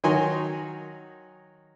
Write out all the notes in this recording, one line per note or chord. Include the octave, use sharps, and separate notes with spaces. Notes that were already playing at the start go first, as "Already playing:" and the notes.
D#3 F#3 D#4 G#5 C6 C#6